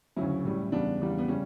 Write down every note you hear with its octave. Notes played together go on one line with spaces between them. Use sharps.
D2 C#3 F#3 C#4 E4
A2 G3
E2 C#3 G3 B3 D4
E2 C#3 G3
B3
C#3 G3 C#4